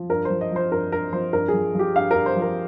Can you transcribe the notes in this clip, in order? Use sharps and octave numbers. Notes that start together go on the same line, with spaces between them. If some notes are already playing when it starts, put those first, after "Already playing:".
Already playing: F3
G2 A#4
F3 C5
D#5
F3 C5
G2 A#4
G2 A#4
F3 C5
G2 A#4
G#4
F3
F3 G4
G2 F5
G2 A#4
C5
F3
A#4